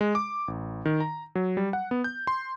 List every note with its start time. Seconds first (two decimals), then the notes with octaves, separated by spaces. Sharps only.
0.01 G#3
0.15 D6
0.48 A1
0.85 D#3
1.00 A#5
1.35 F#3
1.57 G3
1.73 F#5
1.91 B3
2.04 G6
2.27 C6